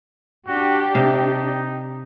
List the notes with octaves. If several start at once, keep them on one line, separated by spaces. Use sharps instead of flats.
D4 F#4 G4
C3 D#4 F5